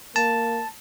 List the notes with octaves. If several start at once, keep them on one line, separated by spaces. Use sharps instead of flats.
A#3 A5